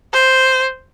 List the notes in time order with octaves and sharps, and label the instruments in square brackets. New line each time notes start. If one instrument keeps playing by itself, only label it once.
[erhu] C5